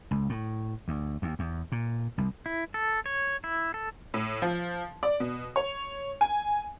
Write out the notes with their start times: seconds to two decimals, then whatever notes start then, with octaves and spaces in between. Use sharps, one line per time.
0.11 C#2
0.29 A2
0.88 D2
1.22 D#2
1.39 E2
1.72 A#2
2.18 C2
2.46 E4
2.74 A4
3.06 C#5
3.44 E4
3.74 A4
4.14 A2
4.42 F3
5.03 D5
5.20 B2
5.56 C#5
6.21 G#5